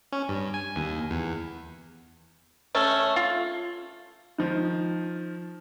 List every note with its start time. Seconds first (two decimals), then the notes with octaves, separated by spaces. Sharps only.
0.12 C#4
0.28 G2
0.54 G#5
0.76 D#2
1.10 E2
2.75 A3 C#4 A5
3.16 F4
4.38 D#3 F3